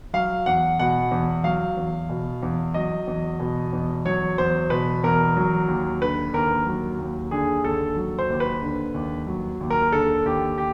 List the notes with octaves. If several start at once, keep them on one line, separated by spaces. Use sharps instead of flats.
F#3 F5
E2 F#5
B2 F#5
E2
F#3 F5
E2
B2
E2
F#3 D#5
E2
B2
E2
F#3 C#5
E2 C5
B2 B4
E2 A#4
F#3
D#2
D3 B4
D#2 A#4
F#3
D#2
D3 G#4
D#2 A4
F#3
C5
D#2
B4
D3
D#2
F#3
D#2
A#4
D3 A4
D#2 G4
G4